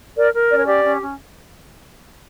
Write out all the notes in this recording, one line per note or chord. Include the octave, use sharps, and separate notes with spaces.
A#4 D5
A#4
C#4 D5
C#5
G4 D5
C#4
C#4